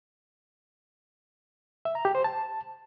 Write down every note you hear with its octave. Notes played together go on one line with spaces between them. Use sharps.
E5
A#5
G4
C5
A5